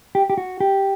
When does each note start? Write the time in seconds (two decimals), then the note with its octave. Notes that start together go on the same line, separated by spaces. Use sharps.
0.15 G4
0.30 G4
0.38 F#4
0.60 G4